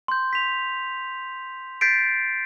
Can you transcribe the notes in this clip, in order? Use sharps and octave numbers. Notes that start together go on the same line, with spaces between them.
C6 G6
B6 F7
G6 A6 B6 C7 D7